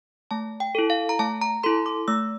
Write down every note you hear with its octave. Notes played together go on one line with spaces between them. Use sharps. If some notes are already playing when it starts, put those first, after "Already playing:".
A3 A5
G5
E4 A4
F5
A#5
A3 A5
A#5
E4 A4 C6
D6
A3 E6